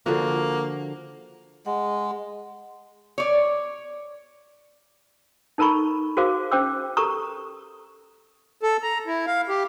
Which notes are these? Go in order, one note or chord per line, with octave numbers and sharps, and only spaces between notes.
D3 F3 A#3 F#4
G#3 F#5
C#5 D5
D#4 A4 A#4 A#5 B5 C#6
F#4 G#4 A#4 C5 F5 D6
C#4 C5 G5 D6 E6
G4 A4 A#4 A#5 C#6 D#6
A4
A#5
E4
F5
G4